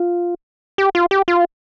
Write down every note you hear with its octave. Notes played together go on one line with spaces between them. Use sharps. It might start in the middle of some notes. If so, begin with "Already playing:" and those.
Already playing: F4
G4
F4
G4
F4